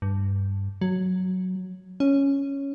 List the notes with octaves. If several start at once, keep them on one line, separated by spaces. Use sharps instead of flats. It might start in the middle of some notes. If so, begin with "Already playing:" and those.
G2
F#3
C#4